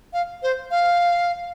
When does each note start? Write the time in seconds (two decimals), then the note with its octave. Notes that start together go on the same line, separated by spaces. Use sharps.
0.13 F5
0.43 C5
0.71 F5